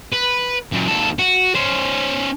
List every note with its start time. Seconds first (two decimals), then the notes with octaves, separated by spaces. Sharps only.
0.12 B4
0.72 F#2 A#2
0.88 D#2 A4
1.19 F#4
1.55 C#4 C5